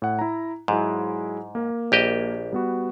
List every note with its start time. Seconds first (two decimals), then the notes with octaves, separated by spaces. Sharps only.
0.02 A2 F#5
0.19 E4 A#5
0.68 G#2 F#3 G#3 E4
1.55 A#3 A#4
1.92 A#1 G4 D#5
2.52 G3 B3 F#4